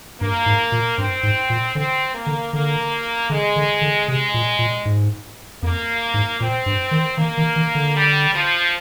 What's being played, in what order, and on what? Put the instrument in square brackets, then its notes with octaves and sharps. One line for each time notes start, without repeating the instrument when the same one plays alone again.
[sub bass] G2 [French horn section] A#3
[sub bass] G#2
A#2
[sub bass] G2 [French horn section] C4
[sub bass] G#2
A#2
[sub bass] D3 [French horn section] C4
[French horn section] A#3
[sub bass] D3
[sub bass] D3 [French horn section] A#3
[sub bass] D3 [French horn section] G#3
[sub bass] D3
D3
[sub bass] C3 [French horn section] G#3
[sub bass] A#2
A#2
G#2
[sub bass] F2 [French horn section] A#3
[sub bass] G#2
[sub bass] A#2 [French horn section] C4
[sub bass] G2
D#3
[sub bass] D#3 [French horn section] A#3
[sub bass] D#3
D#3
D3
[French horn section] G3
F3